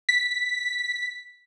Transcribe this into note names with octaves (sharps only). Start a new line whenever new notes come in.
B6